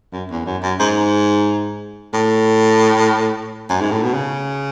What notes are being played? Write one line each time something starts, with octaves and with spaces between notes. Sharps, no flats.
F#2
E2
F#2
F#2
G#2
A2
F#2
G#2
A2
B2
C#3